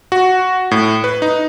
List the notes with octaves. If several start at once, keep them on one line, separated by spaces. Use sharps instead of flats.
F#4
A2
B4
D#4